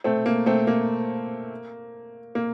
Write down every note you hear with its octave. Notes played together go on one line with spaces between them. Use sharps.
A3 C4
A#3
A3 C4
A#3
A#3